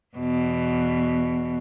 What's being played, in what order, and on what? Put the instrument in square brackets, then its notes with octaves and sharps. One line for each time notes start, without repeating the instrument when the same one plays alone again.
[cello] E2 B2